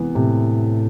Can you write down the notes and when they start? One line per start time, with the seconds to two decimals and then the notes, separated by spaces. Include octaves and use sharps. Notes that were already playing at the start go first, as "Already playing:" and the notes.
Already playing: C3 E3 B3
0.15 A2 C3